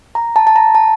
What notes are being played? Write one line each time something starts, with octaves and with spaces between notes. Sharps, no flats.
A#5
A5
A5
A#5
A5